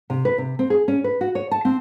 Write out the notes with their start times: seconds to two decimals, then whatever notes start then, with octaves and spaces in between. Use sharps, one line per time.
0.10 C3
0.25 B4
0.38 C3
0.59 C4
0.70 G#4
0.88 C#4
1.04 B4
1.21 F#4
1.35 C#5
1.51 A5
1.65 C4